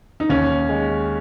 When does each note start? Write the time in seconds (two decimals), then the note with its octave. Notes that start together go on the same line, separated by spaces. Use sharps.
0.20 D#4
0.29 D#2 C#4
0.69 G#3